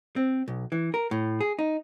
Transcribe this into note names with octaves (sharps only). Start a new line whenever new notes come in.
C4
B1
E3
A#4
A2
G#4
D#4